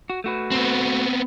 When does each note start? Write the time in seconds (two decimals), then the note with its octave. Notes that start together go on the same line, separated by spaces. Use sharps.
0.10 F#4
0.24 A3 F#4 B4
0.51 B3 C4